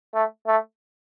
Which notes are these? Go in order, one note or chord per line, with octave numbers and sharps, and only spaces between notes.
A3
A3